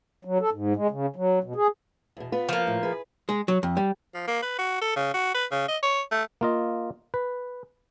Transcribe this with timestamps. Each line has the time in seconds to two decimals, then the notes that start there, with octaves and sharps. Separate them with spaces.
0.25 F#3
0.41 A4
0.52 G#2
0.76 G#3
0.91 C#3
1.16 F#3
1.44 B2
1.56 G#4
2.17 E2 B2
2.32 B3 F4 B4
2.49 F3 A#3
2.67 A2
2.83 G#4 B4
3.29 G#3
3.48 F#3
3.63 F2
3.77 G3
4.14 F3
4.28 A#3
4.42 B4
4.59 F#4
4.82 A4
4.96 C#3
5.14 F#4
5.34 B4
5.51 C#3
5.68 D#5
5.83 C#5
6.11 A3
6.41 A#3 F4 D#5
7.14 B4